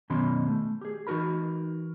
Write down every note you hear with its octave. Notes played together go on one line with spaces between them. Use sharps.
F#2 B2 D#3 C#4 B5 C6
A3
G4 G#4
E3 D#4 F#4 A#4 B5